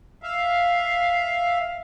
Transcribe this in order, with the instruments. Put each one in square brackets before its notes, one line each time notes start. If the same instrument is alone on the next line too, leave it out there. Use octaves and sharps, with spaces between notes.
[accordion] E5 F5